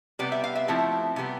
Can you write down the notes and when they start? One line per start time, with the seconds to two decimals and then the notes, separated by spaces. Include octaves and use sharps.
0.19 C3 G3 B3 D5
0.32 E5
0.44 F5
0.55 E5
0.68 F3 A3 C4 E4
1.16 C3 G3 B3